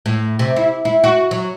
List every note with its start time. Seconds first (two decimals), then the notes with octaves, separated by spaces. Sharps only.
0.06 A2
0.39 C3
0.56 E4
0.85 E4
1.04 F#4
1.31 F#3